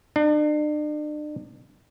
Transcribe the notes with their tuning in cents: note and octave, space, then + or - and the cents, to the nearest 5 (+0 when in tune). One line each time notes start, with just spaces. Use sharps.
D4 +40